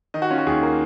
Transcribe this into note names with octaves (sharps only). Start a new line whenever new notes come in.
D#3 D#5
F#4
C#4 F4
F#4
D#2 G#4
A#3